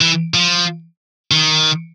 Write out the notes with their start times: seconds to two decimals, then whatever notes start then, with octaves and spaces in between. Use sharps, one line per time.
0.01 E3
0.34 F3
1.31 D#3